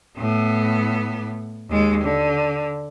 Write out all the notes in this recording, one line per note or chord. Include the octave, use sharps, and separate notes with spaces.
A2 B3
D#2 G#3
D3